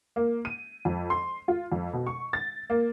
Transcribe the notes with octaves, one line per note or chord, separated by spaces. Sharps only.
A#3
D#7
F2
C6
F4
F2
B2
C#6
A6
A#3